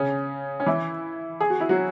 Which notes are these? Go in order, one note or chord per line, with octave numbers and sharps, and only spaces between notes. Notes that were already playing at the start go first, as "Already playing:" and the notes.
Already playing: C#3 C#4
C#4
E3 E4
G#4
F#4
E4
F#3 F#4